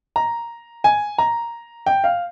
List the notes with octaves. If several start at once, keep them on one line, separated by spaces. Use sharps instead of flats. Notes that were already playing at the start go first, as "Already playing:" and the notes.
A#5
G#5
A#5
G5
F5